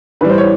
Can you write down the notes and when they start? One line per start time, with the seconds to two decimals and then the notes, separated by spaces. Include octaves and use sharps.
0.21 A2 E3 G3 B4
0.29 C5
0.38 C#5